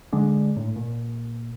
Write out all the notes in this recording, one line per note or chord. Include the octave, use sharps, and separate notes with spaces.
D3 G#3 D4
A2
A#2